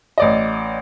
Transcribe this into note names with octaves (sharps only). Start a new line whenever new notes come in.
A1 D5 D#5